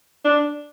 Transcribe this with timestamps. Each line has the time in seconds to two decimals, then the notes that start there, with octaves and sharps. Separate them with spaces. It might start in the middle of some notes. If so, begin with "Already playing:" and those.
0.24 D4